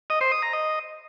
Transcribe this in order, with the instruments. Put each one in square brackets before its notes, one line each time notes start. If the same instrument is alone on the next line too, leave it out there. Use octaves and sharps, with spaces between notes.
[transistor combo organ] D#5
C5
D#6
A#5
D#5